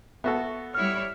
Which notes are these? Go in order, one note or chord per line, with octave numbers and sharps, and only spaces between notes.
B3 F#4 A4 E5
G3 E4 C#5 F6